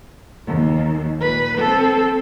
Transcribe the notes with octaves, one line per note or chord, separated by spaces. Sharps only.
D#2
A#2 B4
C4 A4